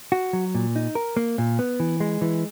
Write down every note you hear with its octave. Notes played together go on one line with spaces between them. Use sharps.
F#4
F#3
A#2
D#4
A#4
A#3
A#2
B3
E3
G#3
E3